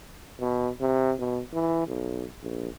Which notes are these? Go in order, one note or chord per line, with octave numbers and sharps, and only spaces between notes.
B2
C3
B2
E3
B1
A#1